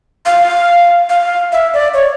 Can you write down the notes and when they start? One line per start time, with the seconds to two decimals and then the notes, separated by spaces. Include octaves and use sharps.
0.26 F5
1.09 F5
1.52 E5
1.74 D5
1.94 C#5